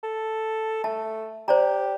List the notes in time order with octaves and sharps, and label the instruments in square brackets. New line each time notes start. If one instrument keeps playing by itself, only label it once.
[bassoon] A4
[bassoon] A3 [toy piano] A5
[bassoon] G4 [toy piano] C5 D5 A#5